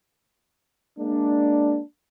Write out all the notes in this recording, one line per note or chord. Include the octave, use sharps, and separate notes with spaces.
G#3 A#3 D4